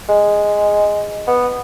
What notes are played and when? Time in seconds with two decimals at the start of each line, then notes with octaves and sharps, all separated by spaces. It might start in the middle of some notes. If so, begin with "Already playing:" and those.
0.09 G#3
1.27 B3